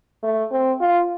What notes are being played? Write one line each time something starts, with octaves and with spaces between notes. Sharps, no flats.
A3
C4
F4